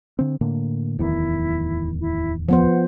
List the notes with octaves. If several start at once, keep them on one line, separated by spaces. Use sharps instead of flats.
D3 C4
A2 D3 A#3
D1 E2 D#3 E4
E4
F3 B3 C5 F#5